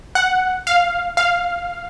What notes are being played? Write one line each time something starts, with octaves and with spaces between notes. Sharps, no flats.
F#5
F5
F5